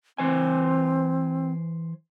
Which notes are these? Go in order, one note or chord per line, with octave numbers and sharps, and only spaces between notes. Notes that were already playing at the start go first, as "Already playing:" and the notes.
E3 C4 C5 G#5